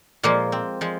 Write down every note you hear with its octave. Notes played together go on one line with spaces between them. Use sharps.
A#2 F3 G#3 A#3
C4
F3 G#3